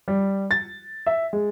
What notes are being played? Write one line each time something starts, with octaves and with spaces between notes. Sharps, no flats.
G3
A6
E5
G#3